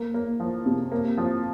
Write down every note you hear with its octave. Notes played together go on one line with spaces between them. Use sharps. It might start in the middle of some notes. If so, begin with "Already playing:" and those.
Already playing: A#3
A#3
F3
C3
A#3
F3